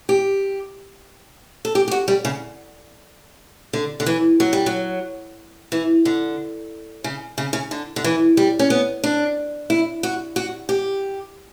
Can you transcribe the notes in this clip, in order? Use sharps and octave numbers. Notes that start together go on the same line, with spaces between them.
G4
A4
G4
G4
F#4
G3
C#3
D3
D3
E3
F#3
G3
F#3
E3
D3
C#3
C#3
C#3
D3
D3
E3
G3
C#4
B3
D4
E4
F#4
F#4
G4